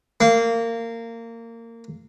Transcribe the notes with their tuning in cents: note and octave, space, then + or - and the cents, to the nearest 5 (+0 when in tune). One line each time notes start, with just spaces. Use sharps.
A#3 -20